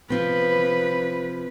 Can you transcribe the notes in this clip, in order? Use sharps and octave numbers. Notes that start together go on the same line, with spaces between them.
C3 F3 C4 B4